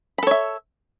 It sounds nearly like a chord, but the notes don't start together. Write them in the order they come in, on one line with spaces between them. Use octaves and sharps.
B5 A4 C#5 E5